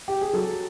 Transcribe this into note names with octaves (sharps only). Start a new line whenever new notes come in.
G4
G#4
F#3 A4